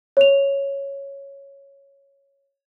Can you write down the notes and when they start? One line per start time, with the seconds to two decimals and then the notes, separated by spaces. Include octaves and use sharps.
0.17 C#5 F7